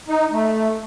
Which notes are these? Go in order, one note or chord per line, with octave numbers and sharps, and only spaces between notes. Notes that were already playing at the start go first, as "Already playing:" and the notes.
D#4
A3